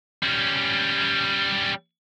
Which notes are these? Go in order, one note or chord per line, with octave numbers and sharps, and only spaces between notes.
G3 C#4